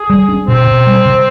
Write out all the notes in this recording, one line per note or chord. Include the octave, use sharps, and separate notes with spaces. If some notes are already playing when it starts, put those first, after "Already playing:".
Already playing: G#4
G3
D4
B2 C4
B2
G3
C3